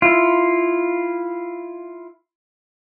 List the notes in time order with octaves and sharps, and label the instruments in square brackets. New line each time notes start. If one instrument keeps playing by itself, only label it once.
[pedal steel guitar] E4 F4